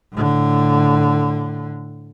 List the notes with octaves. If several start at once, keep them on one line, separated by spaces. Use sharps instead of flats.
A2 D3